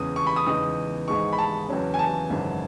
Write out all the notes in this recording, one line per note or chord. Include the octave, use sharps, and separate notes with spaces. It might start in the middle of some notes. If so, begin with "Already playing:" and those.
Already playing: E2 C#3 G#3 D#6
C#6
B5
D#6
E2 C#3 G#3 D#4 D#6
G#1 G#2 E3 G#3 D#4 C#6
B5
A5
E2 C#3 F#3 C#4
G#5
A5
G#1 F#2 C#3 E3